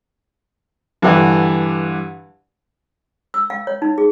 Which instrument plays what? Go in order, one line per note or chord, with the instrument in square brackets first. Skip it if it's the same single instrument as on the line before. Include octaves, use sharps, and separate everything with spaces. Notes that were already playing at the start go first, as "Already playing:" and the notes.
[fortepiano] G2 D3 E3 F#5
[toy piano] E6
F5
C#5
D#4
G#4